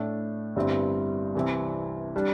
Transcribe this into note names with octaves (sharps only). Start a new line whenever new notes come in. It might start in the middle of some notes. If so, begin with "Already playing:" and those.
Already playing: A2 A3 D4
G1 G2 G3 C4 E4
C2 C3 E3 C4 E4
G3 D4